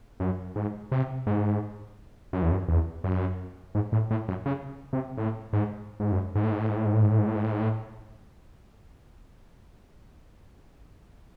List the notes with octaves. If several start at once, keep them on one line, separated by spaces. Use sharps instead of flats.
F#2
G#2
C3
G#2
F#2
E2
F#2
E2
F#2
G#2
A2
A2
F#2
C#3
C3
A2
G#2
G#2
F#2
G#2
A2
G#2
A2
G#2
A2
G#2
A2
G#2
A2
G#2
A2
G#2
A2
G#2
A2